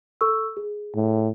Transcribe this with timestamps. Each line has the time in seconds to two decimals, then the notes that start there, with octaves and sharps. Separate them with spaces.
0.21 A4 C#6 E6
0.57 G#4
0.96 A2